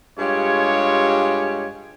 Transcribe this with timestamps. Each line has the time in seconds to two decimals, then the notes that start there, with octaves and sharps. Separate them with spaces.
0.19 G2 G#3 F4 G4 C#5